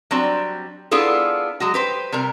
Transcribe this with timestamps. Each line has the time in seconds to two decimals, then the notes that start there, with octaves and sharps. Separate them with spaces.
0.11 F#3 G3 C4 D4
0.91 B3 D4 E4 F4 G#4 A4
1.60 F#3 G#3 F#4
1.74 G4 B4 C5
2.12 C3 G3 A#4